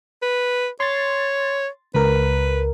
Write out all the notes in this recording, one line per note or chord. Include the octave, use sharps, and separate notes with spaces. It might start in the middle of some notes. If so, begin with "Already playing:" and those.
B4
C#5 C6 A6
C#2 A#4 B4